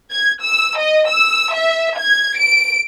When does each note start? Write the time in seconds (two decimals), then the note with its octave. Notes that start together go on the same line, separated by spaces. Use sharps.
0.11 G#6
0.44 E6
0.78 D#5
1.08 E6
1.53 E5
1.98 G#6
2.38 D7